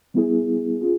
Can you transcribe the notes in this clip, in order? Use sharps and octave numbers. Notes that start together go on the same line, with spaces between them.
G3 B3 E4 G#4
C#4 F4 G#4